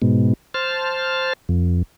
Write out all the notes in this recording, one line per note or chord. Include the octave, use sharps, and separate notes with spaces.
G#2 B2
C5 A5 F6
F2